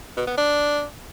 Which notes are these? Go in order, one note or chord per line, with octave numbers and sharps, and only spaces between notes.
B2
B3
D4